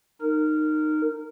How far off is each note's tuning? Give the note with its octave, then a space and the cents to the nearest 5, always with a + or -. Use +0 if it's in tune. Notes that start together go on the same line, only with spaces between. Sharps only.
D#4 -15 A#4 -15